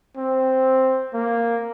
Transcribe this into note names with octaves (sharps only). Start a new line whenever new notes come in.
C4
A#3